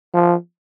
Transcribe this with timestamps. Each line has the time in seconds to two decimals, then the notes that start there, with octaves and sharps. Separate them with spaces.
0.14 F3